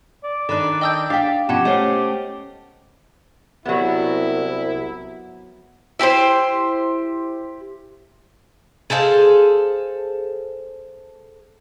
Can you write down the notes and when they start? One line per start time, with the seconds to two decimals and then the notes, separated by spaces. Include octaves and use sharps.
0.24 D5
0.49 D#3 D4 A4 B5 F#6
0.81 D#5 G5 A5 D#6 E6 G6
1.10 D4 F5 G5 D6 B6
1.49 B2 F3 B3 C#4 G4 F#5 A5
1.65 A3 C#4 C5 D#5
3.66 C2 F#3 B3 E4
5.99 E4 G4 B4 C5
8.90 G#4 A4 C5 F5